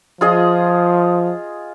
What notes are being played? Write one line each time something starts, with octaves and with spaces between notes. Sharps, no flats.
F3 F4 G#4 D#5